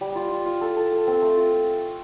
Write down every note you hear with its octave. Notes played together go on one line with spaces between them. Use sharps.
G3
F4
F4
F4
A4
A4
A4
C4
A3
F4
F4